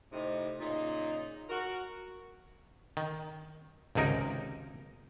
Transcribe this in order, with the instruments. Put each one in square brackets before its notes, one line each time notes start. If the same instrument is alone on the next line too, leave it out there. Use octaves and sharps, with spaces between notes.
[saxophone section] A2 C3 C4 D#4
A#2 C#3 D#4
F#4 A#4
[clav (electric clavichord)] D#3
G#1 C#2 C3 D#4 A#4